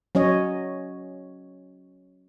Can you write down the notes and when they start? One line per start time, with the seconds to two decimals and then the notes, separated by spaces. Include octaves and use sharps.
0.15 F#3 C#4 C#5 D#5